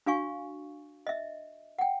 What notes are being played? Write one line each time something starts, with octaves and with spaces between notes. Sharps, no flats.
D4 F#4 F5 G#5 C#6
D#5 E5
F#5 G5